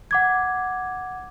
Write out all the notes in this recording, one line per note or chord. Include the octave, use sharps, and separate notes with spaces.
F#5 D6 G#6